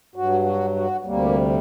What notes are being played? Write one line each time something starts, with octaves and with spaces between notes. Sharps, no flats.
G2 F#3 F#4
F#4
F#4
D2 C3 G3 A#3